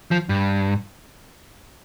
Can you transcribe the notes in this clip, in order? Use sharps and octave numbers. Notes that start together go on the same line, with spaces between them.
F3
G2